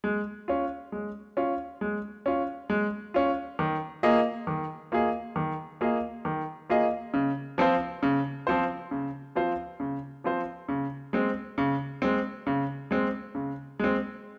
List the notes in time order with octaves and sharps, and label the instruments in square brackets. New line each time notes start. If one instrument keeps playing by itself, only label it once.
[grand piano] G#3
C#4 F4
G#3
C#4 F4
G#3
C#4 F4
G#3
C#4 F4
D#3
A#3 F4 G#4 D#5
D#3
A#3 F4 G#4 D#5
D#3
A#3 F4 G#4 D#5
D#3
A#3 F4 G#4 D#5
C#3
F3 C4 F4 C5
C#3
F3 C4 F4 C5
C#3
F3 C4 F4 C5
C#3
F3 C4 F4 C5
C#3
G#3 C4
C#3
G#3 C4
C#3
G#3 C4
C#3
G#3 C4